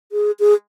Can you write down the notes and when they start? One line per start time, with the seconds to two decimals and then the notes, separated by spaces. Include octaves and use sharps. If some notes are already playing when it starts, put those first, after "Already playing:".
0.12 G#4
0.40 G#4